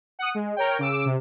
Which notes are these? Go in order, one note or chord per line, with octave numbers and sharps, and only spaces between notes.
F#5 D#6
G#3
A#4 C#5 G5
C#3 D6 E6
C3